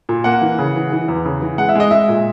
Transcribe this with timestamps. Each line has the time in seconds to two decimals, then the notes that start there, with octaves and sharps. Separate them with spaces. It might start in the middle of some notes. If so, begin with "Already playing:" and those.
0.09 A#2
0.24 A#3 F#5
0.42 E3
0.59 C#3
0.76 E3
0.92 E3
1.08 E2
1.25 C#3
1.42 E3
1.58 G#3 F#5
1.69 E5
1.75 G#3 D#5
1.91 G#3 E5
2.09 A#2